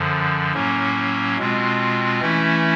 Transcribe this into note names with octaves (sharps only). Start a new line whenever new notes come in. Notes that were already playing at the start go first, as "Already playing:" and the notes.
Already playing: F#2 D3 F3
A2 F#3 A#3 C#4
B2 G#3 C4 F4
E3 A3 C#4 E4